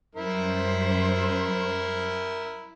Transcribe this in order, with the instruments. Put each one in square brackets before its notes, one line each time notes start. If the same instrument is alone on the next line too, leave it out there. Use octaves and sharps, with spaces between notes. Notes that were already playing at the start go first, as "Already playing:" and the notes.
[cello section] F#2 G3 C5 [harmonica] E4 A#4 E5